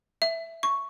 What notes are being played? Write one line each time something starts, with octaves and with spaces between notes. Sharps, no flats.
E5
C#6